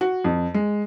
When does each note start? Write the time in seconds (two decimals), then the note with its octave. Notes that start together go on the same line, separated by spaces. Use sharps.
0.01 F#4
0.24 F2
0.54 G#3